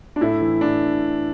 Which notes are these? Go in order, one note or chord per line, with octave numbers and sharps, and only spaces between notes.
D4
A2 E4
E3
A2 D4